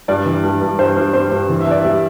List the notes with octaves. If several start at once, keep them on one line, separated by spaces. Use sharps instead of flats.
G2 D5
E3
G2
G2
G2 C5
G2
G3 C5
G2
E3
E5
E3 D5
G3 E5